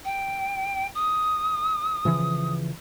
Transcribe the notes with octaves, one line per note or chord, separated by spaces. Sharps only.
G5
D#6
C#3 E3 F3